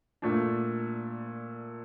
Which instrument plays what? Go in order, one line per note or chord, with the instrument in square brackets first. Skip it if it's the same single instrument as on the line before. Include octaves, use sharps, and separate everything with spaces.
[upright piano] A#2 A3 D4